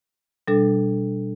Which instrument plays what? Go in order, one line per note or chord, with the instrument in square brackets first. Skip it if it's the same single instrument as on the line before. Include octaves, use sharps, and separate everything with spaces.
[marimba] B2 G3 D4 A4